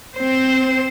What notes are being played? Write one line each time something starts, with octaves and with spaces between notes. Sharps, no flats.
C4 C5